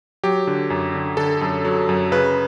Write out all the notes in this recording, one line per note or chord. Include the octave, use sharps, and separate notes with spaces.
F#3 G4
D3
F#2
D3
D3 A4
F#2
F#3
F#2
C#3 B4